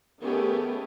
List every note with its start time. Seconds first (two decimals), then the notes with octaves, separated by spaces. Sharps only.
0.22 D#3 A3 B3 C#4 G4 G#4